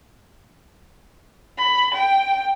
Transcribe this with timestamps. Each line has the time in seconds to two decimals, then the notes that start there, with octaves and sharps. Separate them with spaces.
1.58 B5
1.94 G5